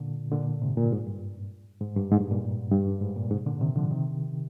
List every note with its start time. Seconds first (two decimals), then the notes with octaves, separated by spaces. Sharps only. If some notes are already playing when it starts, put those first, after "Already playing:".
Already playing: A#2 D3
0.31 A#2 D3
0.61 G#2 C3
0.77 A#2
0.92 G#2
1.07 G2
1.81 G#2
1.96 G2
2.11 G#2
2.21 G2
2.31 A#2
2.71 G2
3.02 G#2
3.16 A#2
3.31 G#2 C3
3.46 A#2 D3
3.61 C3 D#3
3.76 D3 F3
3.91 C3 D#3